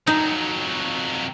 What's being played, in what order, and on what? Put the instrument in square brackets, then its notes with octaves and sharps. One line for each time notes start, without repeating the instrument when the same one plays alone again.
[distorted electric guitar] F2 F#3 [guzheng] D#4